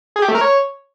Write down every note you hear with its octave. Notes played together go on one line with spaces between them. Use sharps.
G#4
G4
A3
A#4
C#5